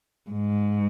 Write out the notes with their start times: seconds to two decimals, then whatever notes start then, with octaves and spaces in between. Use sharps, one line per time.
0.30 G#2